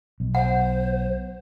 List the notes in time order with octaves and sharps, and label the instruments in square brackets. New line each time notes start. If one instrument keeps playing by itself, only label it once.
[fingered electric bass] B1
[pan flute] C5 [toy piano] F#5